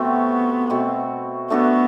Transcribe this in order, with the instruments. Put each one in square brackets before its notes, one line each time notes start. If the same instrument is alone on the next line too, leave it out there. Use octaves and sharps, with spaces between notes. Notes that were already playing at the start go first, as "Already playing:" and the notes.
Already playing: [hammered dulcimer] C3 A3 C4 F#4 [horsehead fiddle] B3
[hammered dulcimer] B2 A3 C4 F#4
[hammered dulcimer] A3 D4 F#4 A4 [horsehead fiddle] B3